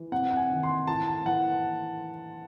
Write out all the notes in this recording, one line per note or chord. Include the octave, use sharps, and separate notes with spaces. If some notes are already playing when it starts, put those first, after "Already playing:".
Already playing: E3
C3 F#5
F#5
G#5
D#3
C6
A2 A5
A5
E3 F#5